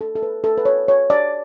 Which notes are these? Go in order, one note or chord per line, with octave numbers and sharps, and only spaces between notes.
A4
A4
B4
A4
B4
C#5
C#5
D5